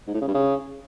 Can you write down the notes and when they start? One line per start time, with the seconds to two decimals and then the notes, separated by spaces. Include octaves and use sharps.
0.07 G#2
0.14 A2
0.21 C#3
0.28 G2
0.34 C#3